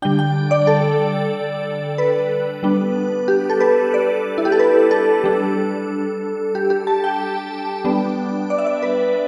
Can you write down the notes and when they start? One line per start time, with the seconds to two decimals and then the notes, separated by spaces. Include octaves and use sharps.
0.02 D3 G3 D4 G5
0.19 G5
0.51 D5
0.67 A4
1.98 B4
2.63 G3 B3 D4
3.28 G4
3.50 A4
3.61 B4
3.94 D5
4.38 E4
4.45 G4
4.52 A4
4.59 B4
4.91 A4
5.24 G3 D4
6.55 G4
6.70 G4
6.87 A5
7.04 G5
7.85 G3 B3 D4
8.50 D5
8.58 E5
8.67 D5
8.83 B4